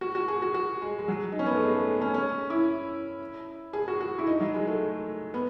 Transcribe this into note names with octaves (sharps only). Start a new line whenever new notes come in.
F#4
F#4
G#4
F#4
F#4
G#3
G#3
F#3
D#4
C#4
B3
A3
G#3
A3
C#4
C#4
E4
G#4
F#4
F#4
E4
D#4
F#3
G#3
A3
B3